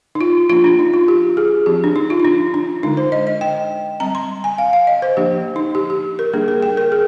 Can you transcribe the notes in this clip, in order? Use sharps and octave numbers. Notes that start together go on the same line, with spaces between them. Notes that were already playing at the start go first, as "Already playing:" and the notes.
D#4
F4
F3 A#3 D4 F4
D4
D#4
F4
G4
G#4
F3 C4 G4
D4
D#4
F4
D#4
D4
D4
D3 G#3 D4 D#4
C5
D#5
D#5
G5
G3 C4 A#5
C6
G#5
F5
F5
D#5
C5
F3 A#3 D4 G4
D#4
G4
G4
A#4
G3 A#3 D4 G#4
A#4
G5
A#4
G#4